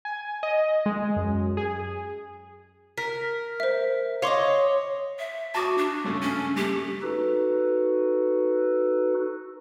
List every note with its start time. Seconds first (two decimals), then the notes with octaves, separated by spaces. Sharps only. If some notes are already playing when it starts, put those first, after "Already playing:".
0.05 G#5
0.43 D#5
0.86 G#3
1.16 F#2
1.57 G#4
2.98 A#4 B6
3.60 C5 E5
4.22 C#5 D#5 F5 C6 D6
5.19 E5
5.55 F#4 A5 D6 D#6
5.78 D4
6.04 G2 C#3 A3
6.22 C#4
6.56 G2 A3 G4
7.02 D#4 F#4 A4 B4